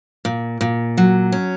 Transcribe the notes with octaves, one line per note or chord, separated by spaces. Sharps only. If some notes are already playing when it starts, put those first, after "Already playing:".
A#2
A#2
F#3
C#4